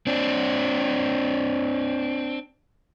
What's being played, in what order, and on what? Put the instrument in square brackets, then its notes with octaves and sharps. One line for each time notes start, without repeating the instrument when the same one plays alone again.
[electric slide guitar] C4 D4